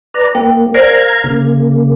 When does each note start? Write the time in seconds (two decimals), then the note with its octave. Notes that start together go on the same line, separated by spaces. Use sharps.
0.14 B4 D5 A#5
0.35 A#3 G5
0.74 A#4 C5 D5 F5 A#5 G#6
1.24 C#3 A#3